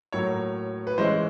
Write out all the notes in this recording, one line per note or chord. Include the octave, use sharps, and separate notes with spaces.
A2 F#3 A#3 C#5
B4
E3 G#3 C#4 E4 C5